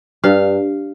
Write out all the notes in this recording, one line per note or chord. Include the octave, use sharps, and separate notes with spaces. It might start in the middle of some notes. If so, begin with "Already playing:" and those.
G2 F5